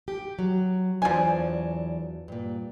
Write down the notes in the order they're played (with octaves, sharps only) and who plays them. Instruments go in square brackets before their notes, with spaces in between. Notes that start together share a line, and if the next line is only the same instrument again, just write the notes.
[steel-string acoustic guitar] G4
F#3
[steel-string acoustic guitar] E2 F#3 D4 [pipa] F3 G#5
[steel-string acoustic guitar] G2 A#2